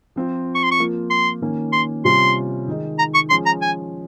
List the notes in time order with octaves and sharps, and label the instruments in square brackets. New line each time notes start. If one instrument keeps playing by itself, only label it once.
[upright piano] F3 C4 F4
[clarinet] C#6
C6
C#6
[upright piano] F3 A#3 F4
[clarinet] C6
[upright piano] D#3 A#3 C#4
[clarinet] C6
[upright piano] C3 G3 C#4 F4 [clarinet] C6
[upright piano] D#3 G#3 D#4
[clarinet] A#5
C#6
[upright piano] F3 G#3 C#4 [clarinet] C6
[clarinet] A#5
G#5